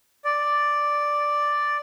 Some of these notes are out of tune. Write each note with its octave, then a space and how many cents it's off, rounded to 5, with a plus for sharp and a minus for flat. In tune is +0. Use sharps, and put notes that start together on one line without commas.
D5 +0